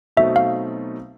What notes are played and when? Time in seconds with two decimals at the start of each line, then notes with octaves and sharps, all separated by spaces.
0.17 B2 F#3 A3 C4 D#4 E5
0.36 F5